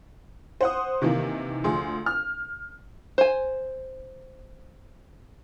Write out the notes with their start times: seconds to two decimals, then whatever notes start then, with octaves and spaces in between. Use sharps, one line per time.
0.61 C5 F#5 D#6
1.02 C3 D#3 E3 A#3
1.64 D2 F3 G#4 C6
2.06 F6
3.18 C5 G#5